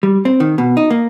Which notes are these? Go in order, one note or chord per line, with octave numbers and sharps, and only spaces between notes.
G3
C4
D#3
B2
D#4
A#3